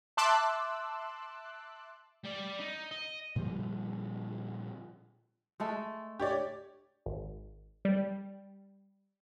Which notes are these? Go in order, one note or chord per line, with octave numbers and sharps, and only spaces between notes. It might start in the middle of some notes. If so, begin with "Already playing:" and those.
E5 A5 C6 D6 E6 F#6
G3 D5
D#4
D#5
A#2 D3 F3 G3
G#3 A3 A4
G4 C#5 D5
G#1
G3